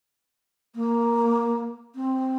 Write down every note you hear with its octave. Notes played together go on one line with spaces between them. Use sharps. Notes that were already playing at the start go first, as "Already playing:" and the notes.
A#3
C4